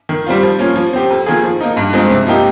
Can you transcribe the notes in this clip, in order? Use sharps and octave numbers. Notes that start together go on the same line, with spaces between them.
D#3
G3 C4 F4
F3
A#3 C#4 F4
F3
C4 G4
F2
D#3 A#3 F4 G#4
F3
A#3 D#4
G2
F3 G#3 C4 D#4
C3
F3 A#3 D#4 G4